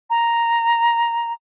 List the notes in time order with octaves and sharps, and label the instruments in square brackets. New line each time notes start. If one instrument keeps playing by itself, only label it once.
[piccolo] A#5